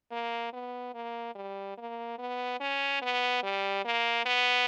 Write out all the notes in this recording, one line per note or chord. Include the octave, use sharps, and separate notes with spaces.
A#3
B3
A#3
G3
A#3
B3
C#4
B3
G3
A#3
B3